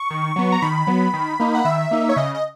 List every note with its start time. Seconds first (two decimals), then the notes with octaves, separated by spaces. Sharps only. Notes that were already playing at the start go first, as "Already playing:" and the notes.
Already playing: C#6
0.10 D#3
0.36 F#3 B3
0.52 A#5
0.62 D#3 B5
0.87 F#3 B3
1.13 D#3
1.40 A#3 D#4
1.55 F#5
1.65 D#3 E5
1.91 A#3 D#4
2.09 C#5
2.16 C#3 D#5
2.35 D#5